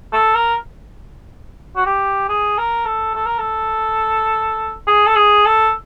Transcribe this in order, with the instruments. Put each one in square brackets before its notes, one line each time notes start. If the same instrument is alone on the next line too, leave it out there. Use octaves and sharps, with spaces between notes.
[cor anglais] A4
A#4
F#4
G4
G#4
A#4
A4
A4
A#4
A4
G#4
A4
G#4
A4